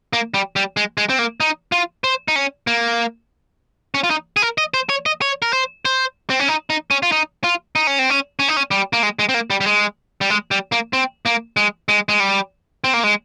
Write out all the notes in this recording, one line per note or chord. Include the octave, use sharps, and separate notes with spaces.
A#3
G3
G3
G#3
G#3
C4
A#3
D#4
F4
C5
D#4
C#4
A#3
C#4
F4
D#4
G#4
A#4
D#5
C5
C#5
D#5
C#5
A#4
C5
C5
C4
C#4
D#4
D#4
C#4
F4
D#4
F4
D#4
C#4
C4
C#4
C#4
D#4
C#4
G3
A#3
G#3
G#3
C4
A#3
G3
G3
G#3
G3
G#3
G3
A#3
C4
A#3
G#3
G#3
G#3
G3
C4
A#3
G#3